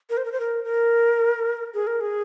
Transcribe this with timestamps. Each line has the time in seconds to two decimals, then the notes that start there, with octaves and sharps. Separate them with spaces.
0.10 A#4
0.17 C5
0.25 A#4
0.32 C5
0.40 A#4
0.64 A#4
1.74 G#4
1.87 A#4
2.01 G#4